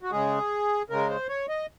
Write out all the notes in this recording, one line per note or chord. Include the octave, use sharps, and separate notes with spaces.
F#4
C#3 G#3 G#4
C#3 G#3 A#4
C5
C#5
D#5